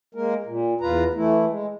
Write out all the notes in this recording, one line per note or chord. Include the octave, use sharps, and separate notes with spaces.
G#3 A#3 A#4
A#2
E2 F4 B4 A#5
E3 A3 E4
G#3